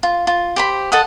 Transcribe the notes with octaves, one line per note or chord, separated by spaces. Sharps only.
F4
F4
G4 C5 B5
A4 D#5 F#5 D#6